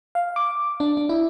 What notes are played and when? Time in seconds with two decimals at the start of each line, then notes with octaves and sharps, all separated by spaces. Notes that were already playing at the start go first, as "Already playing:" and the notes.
0.15 F5
0.36 D6
0.80 D4
0.97 D4
1.09 E4